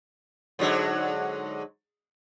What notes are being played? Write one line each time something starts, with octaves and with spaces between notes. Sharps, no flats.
G#2 D3 F#3